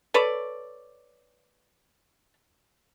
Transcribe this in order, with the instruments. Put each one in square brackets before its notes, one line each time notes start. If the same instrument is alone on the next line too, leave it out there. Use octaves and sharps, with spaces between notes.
[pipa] A4 B4 C#5 D5